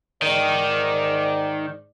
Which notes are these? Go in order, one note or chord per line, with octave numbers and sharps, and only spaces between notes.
G#2 D#3 D5